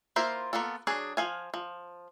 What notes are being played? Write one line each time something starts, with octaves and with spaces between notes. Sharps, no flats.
A#3 E4 F4 A#4 C5
A#3 B3 F4 A4
F#3 D4 G#4
F3 F5 G#5
F3